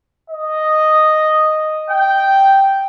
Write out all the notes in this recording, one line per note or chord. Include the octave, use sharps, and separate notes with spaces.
D#5
G5